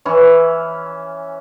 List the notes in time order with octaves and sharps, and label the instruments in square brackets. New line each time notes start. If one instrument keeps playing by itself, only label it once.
[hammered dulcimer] E3 C#4 C#6